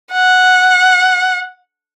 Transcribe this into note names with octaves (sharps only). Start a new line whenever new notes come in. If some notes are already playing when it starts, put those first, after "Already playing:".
F#5